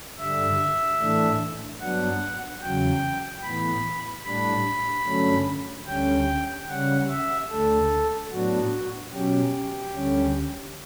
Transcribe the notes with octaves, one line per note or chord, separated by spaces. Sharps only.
G2 D3 G3 E5
A2 E3 A3 D4
G2 F#3 B3 D4 F#5
E2 C#3 F#3 G5
A2 E3 B3 B5
A2 G3 D4 B5
G2 D3 F#3 A3 C#4
D2 D3 G3 C#4 G5
C#3 G3 C#4 F#5
E5
D2 D3 A3 A4
A2 F#3 B3 D4 F#4
B2 F#3 C#4 G4
D2 D3 G3 C#4